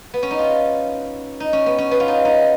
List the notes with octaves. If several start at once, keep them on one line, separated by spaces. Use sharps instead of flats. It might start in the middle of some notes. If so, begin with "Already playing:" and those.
B3
C#4
D#4
F4
D#4
C#4
B3
C#4
B3
F4
D#4
D#4